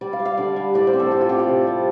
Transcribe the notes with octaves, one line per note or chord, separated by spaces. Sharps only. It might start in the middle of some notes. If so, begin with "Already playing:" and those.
G3 D5
F5
G3
F5
D3 D5
G3
A2 D5
C5
C4
A4
C4 G4
F4
C4 G4
D5
C3
G3